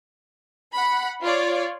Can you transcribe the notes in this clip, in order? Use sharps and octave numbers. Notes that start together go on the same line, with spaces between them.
F#5 B5
F4 C#5 D5